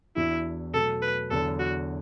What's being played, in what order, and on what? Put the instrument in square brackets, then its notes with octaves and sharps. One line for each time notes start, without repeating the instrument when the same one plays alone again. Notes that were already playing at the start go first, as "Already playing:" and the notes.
[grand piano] E2 E3 D4 F#4 [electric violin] E4
[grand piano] B2 F#3 A3 [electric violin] A4
[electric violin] B4
[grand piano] E2 D3 F#3 [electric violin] A4
[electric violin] F#4